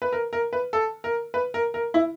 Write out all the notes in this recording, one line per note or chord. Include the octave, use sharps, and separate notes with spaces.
B4
A#4
A#4
B4
A4
A#4
B4
A#4
A#4
E4